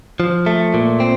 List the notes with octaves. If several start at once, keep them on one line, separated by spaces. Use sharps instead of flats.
F3
A3
A#2
C4